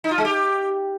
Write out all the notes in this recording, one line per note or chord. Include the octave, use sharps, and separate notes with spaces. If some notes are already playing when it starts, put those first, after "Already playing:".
D#4
F4
G#3
G4